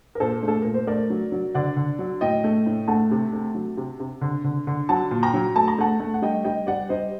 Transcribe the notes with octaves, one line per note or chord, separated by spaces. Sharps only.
A#4
A#2 A4 C5
A3 A4
A#2 A#4
C5
A3 A#4 D5
F#3
F#3
D3 D5 F#5
D3
F#3
A2 D#5 G5
A3
A2
A3 F#5 A5
C3
A3
F#3
C3
C3
D3
D3
D3
F#3 F#5 A5
A#2
G5 A#5
F#3
A3 A5
A#5
A3 F#5 A5
A3
F#5
G3 D#5 G5
G3 D#5 G5
G3 D5 F#5
G3 C5 D#5